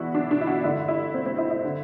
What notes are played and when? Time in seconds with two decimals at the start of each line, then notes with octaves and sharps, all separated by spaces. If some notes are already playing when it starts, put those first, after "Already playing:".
Already playing: E2 B2 E4 F#4
0.15 D4
0.31 D4
0.41 E4
0.47 F#4
0.64 G2 D3 E4
0.88 E4
1.14 C4
1.26 C4
1.38 E4
1.51 E4
1.64 D3